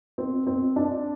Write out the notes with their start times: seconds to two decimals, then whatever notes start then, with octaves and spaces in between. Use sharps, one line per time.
0.18 C4
0.47 C4
0.76 D4